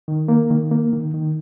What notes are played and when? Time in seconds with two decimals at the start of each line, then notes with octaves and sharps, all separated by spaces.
0.08 D#3
0.28 A#3
0.51 D#3
0.71 A#3
0.93 D#3
1.14 D#3